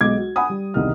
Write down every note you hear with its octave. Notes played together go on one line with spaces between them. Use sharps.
B1 G#3 D6 G#6
F#4
F#5 G#5 B5 D#6
G3
E1 C2 D#3 F6